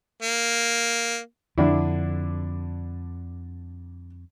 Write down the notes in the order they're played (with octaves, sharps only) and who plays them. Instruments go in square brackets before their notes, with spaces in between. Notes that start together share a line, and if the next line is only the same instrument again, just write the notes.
[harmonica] A#3
[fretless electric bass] F2 [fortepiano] D3 D4 E4